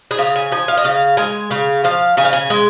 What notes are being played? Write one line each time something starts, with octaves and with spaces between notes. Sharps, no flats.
G#4
C#3 F4
G#5
F3 G#5
F5
D#5
C#3 F5
G#3 G#5
C#3 F5
F3 F5
C#3 G#5
F5
G#5
G#3